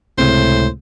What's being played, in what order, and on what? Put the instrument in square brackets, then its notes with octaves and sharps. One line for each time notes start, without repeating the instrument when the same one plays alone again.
[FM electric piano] C#2 C3 G#3 [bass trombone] A2 [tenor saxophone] C5